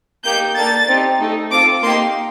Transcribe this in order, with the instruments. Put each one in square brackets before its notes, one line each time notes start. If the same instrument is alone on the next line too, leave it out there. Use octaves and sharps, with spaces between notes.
[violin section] A#3 D#4 G4 G6
A#3 D4 A4 A6
C4 D#4 G4
A3 D#4 A4
C4 F4 A4 D6
A#3 D#4 G4 C6